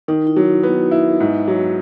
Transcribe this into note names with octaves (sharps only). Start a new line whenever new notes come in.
D#3 D#4
E4
F#3
E4
B3 D#4
E4
G#2
F#3